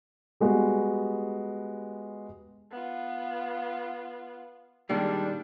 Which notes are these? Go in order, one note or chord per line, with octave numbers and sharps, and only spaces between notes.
G3 G#3 B3 F#4
B3 F4
A#2 D#3 G3 G#3 D4